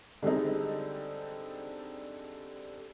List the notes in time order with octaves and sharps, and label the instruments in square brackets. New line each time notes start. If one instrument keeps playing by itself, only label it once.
[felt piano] D3 G3 G#3 C4 D#4